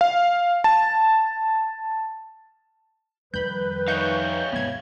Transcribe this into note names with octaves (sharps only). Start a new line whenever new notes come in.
F5
A5
F2 D#3 G3 B4 B5 G6
D#4 C#5 E5 F5 C#6 G6
G#1 E2 B3 G#6